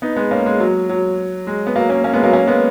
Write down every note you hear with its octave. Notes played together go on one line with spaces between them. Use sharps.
B3 D#4
G#3 B3
A#3 C#4
G#3
F#3
F#3
G#3
B3
F#3 A#3
A#3 C#4
A#3 C#4
G#3 B3
F#3 A#3
A#3 C#4
G#3 B3